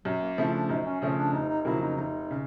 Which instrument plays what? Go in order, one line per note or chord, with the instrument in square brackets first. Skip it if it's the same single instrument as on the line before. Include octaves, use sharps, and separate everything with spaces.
[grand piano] F#2 [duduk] F#3
[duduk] A#3
[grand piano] C#3 F3 A3 [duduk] E4
[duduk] D4
[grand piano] F#2 [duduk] D#4
[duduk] C#4
[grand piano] C#3 F3 A3 [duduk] C#4
[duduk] D4
[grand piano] F1 [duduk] D#4
[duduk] D#4
[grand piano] F2 C#3 F#3 A#3 [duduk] E4
[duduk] D#4
[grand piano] F1 [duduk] D#4
[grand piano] C#3